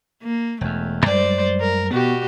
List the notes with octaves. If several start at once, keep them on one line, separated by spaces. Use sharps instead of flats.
A#3
E1 E2 A3
F#2 G3 G#3 C5 D5
A#4
B2 B3 F#4 G4